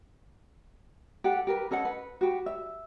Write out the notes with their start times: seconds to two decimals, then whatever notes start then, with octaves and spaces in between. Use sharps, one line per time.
1.24 G4 A4 F#5
1.47 G4 A#4 B4
1.71 C#4 A4 D#5 F#5
1.85 B4
2.21 F#4 G4
2.46 E5